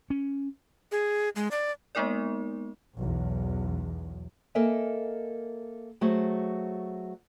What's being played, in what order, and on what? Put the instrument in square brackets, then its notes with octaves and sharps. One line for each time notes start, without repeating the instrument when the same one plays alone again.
[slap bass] C#4
[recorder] G#4
G#3
D5
[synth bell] G#3 A#3 B3 D#4 A#4 D5
[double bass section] B1 E2
[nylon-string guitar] A#3 A4 A#4 D#5 E5 G#5
F#3 A3 F#4 G#4 C5